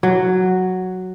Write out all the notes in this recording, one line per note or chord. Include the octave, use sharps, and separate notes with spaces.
F#3